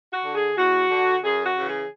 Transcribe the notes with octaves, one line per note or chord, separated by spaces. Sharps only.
F#4
D3
G#4
E2 F#4
D3
F#2 G#4
F#4
C#3 E3
G#4